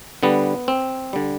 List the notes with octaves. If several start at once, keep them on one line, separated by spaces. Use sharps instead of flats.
D3 G3 B3
C4
D3 G3